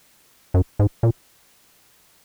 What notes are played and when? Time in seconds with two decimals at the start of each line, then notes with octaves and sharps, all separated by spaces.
0.54 F#2
0.79 G#2
1.03 A#2